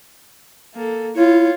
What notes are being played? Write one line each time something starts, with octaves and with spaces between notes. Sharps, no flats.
A#3 A4
E4 F4 C#5